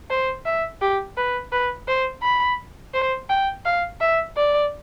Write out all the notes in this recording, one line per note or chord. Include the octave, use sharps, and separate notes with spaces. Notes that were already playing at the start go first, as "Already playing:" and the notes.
C5
E5
G4
B4
B4
C5
B5
C5
G5
F5
E5
D5